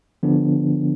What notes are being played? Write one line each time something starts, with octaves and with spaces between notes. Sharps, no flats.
D3 F3 B3 D4